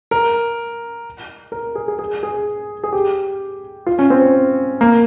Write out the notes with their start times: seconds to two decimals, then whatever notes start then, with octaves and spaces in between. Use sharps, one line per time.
0.11 A#4
1.52 A#4
1.75 G#4
1.88 G#4
1.99 G#4
2.23 G#4
2.84 G#4
2.93 G4
3.86 F4
3.99 C#4
4.10 C4
4.81 A#3